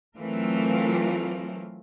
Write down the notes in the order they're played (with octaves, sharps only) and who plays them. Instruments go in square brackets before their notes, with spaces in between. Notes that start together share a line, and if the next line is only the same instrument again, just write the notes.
[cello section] E3 F#3 A3 C4 F4 A#4